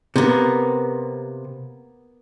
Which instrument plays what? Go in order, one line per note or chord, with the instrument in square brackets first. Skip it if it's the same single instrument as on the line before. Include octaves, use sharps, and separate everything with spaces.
[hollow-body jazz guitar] C3 [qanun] A#3 B3